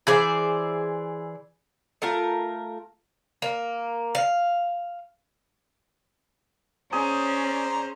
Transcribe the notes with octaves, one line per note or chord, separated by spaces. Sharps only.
E3 G#4 C5 D5
A3 F4 A#4 F5
A#3
F5
C#4 G#4 C5 D5 A#5